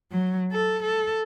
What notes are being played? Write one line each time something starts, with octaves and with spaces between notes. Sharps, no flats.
F#3
A4
A4